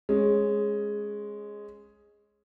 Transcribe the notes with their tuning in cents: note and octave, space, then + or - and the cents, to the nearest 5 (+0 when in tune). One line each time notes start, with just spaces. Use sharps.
G#3 +0 C#4 -20